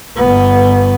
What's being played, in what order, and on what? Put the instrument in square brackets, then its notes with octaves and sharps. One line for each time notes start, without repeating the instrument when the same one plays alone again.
[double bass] G1 B3